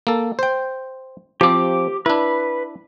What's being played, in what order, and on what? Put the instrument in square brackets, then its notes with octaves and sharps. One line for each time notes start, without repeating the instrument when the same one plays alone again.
[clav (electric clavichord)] A#3 A4
C5 G5
[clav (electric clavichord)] F3 C4 [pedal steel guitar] G4 D6
[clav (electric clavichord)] D4 E4 [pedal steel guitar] B4